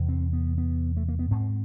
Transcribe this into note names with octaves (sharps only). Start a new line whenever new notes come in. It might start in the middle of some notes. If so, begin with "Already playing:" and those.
Already playing: E2 C3
C4
B3
B3
A3
A#3
B3
G#2 C4